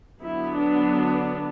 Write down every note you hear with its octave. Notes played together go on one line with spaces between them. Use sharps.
D3 F#3 B3 E4
D4